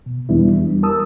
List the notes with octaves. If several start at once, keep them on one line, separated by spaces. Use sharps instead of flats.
B2
E2 E3 G3 B3 D4 E4
G3
A#4 A5 D#6 E6